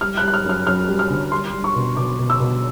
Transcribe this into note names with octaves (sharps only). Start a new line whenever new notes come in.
G3 F6
F#6
G3
F#6
F6
F#2 F6
F#2 F6
G3
F6
D3
G3 C6
G3
C#6
B2
B2 D6
B2
E6
B2